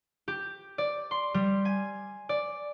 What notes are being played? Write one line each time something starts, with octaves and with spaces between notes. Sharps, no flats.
G4
D5
C6
G3
G#5
D5